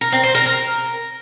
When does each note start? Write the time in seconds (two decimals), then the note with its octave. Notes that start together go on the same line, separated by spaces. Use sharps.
0.01 A#4
0.12 C4
0.24 C5
0.35 A#4
0.46 A#4